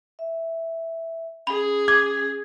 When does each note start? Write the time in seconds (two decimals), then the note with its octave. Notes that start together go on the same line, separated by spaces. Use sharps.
0.19 E5
1.47 C#4 G#4 B5
1.88 D6 G#6